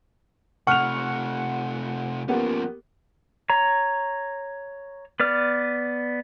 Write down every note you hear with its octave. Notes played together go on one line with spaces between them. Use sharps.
C3 A3 F#5 C#6 F6 F7
F3 A#3 B3 C#4 G4
C#5 A#5
B3 B4 D5 F6